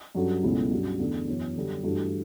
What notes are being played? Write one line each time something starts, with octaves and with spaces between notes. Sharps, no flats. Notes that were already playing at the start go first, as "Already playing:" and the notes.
G2 F#3 C#4 F#4 A4
C#2 B2 A3 C#4 E4
G2 F#3 C#4 F#4
E2 D3 A3 D4
F#2 E3 B3
F#2 D3 G3
G2 E3 A3 D4 F#4